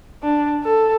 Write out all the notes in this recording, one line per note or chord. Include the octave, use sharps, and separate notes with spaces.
D4
A4